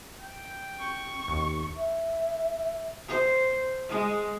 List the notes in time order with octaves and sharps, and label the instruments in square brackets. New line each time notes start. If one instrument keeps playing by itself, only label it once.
[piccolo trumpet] G5
[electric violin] C#6
[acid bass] D#2
[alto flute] E5
[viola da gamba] C5
G#3